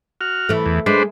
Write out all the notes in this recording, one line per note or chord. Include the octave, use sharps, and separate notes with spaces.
F#4 F6
E3 A3
E2
G#3 D4 B4 C5